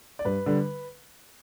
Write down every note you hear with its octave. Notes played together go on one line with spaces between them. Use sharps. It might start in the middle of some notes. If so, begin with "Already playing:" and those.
D5
G2 B4
D3 G3